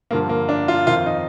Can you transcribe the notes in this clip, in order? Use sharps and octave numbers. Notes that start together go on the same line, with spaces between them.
G2 D3 F3 A#3
A#3
D4
F4
F2 D#3 F4
D#4